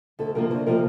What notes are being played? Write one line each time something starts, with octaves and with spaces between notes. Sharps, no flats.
D2 A4
C3 F3 A#3 A#4
D2 C5
C3 F3 A#3 A#4